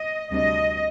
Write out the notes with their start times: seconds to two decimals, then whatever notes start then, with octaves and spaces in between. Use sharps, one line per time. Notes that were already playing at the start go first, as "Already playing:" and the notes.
Already playing: D#5
0.31 D2 C3 G3 D4 D#5